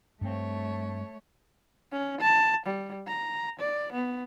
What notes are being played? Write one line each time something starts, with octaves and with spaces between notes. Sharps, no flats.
G2 A3 C4 C#5
C#4
A5
G3
A#5
D5
B3